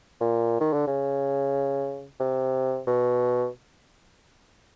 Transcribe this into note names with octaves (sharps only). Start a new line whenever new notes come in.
A#2
D#3
D3
C#3
C3
B2